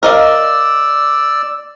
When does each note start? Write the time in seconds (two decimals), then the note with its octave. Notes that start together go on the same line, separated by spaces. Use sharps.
0.03 A#4 D5 D#5 F5 E6